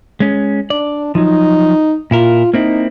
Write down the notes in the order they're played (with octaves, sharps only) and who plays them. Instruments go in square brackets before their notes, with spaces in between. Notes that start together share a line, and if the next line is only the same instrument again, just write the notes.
[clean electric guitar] G#3 C#4
[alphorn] D4 [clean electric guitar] D5
[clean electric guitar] F3 F#3 [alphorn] D#4
[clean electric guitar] A#2 E4 A#4 [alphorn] F4
[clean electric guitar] A#3 C4 E4 [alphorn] D#4